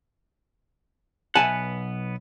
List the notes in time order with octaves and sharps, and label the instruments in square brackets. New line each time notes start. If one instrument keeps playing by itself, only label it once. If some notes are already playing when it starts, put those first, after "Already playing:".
[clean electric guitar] B1 B3 F#5 [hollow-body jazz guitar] E5 G#5 A5